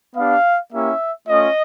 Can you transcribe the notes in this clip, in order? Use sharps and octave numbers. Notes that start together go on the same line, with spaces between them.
B3 D4 G4 F5
A#3 C#4 E4 G4 E5
A3 C#4 F4 D#5